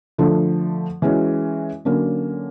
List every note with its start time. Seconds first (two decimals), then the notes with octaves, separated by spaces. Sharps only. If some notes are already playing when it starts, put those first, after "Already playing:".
0.18 D3 F3 A3
1.02 E3 G#3 C#4 F#4
1.85 D3 F#3 A#3 C#4